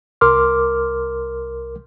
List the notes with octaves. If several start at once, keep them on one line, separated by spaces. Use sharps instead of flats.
C2 A#4 C6 D6 F6